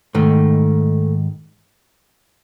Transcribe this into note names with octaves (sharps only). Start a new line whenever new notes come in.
G#2 D#3 A3